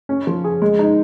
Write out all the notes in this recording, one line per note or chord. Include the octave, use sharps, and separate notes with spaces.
C#4
F3
G#4
G#3
D#4